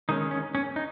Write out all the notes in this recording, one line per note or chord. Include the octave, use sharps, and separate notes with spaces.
D#3 G#3 C#4 D#4
C#4
C#4
D#4